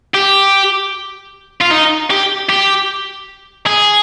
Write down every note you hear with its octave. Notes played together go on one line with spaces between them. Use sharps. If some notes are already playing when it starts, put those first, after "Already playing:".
G4
F4
D#4
G4
G4
G#4